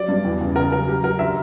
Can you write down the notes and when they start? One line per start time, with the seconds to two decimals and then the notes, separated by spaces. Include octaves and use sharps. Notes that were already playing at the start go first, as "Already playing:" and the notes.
Already playing: F#3 D5
0.08 G2
0.25 E2
0.41 C#3
0.56 C#3 A#4
0.72 F#3 A#4
0.88 F#3 G4
1.04 F#3 A#4
1.19 D3 E5